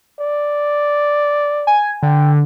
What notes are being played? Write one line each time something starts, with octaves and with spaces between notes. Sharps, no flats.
D5
G#5
D3 G5